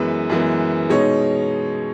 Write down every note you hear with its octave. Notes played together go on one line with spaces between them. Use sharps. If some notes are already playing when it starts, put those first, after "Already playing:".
Already playing: F#2 E3 G#3 B3 B4
F#2 E3 G#3 B3
B2 G#3 D#4 C#5